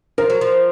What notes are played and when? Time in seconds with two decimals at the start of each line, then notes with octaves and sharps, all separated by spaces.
0.18 F3 A#4
0.30 F#3
0.41 F3